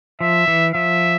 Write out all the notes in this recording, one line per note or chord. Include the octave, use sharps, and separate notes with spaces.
F3 E5
E3
F3 E5